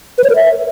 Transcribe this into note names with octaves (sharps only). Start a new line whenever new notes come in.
B4
C#5
A#4
E5